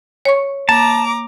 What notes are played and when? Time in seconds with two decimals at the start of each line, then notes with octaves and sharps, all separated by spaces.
0.25 C#5 C#6
0.69 A#3 A5 A#5 D6